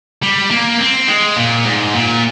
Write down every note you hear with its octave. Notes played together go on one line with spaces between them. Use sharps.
G3
A#3
C4
G#3
A#2
G#2
A#2